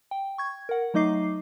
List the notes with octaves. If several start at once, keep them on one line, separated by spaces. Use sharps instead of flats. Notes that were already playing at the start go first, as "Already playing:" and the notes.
G5
C#6 G#6
A#4 F#5
F#3 A3 D#4 D#5 D6 C7